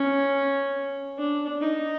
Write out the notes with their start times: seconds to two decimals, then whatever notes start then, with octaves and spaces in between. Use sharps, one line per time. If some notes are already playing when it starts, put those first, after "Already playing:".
Already playing: C#4
1.18 D4
1.61 D#4